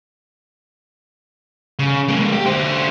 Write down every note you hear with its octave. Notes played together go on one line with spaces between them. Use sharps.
C#3
G#3 A#3
G4
D3 C5